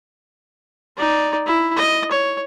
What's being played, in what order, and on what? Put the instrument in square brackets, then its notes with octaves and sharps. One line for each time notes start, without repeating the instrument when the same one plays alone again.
[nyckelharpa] D#4 D5
E4
D#5
C#5